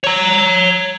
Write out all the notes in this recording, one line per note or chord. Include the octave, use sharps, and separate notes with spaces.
C#5 A#5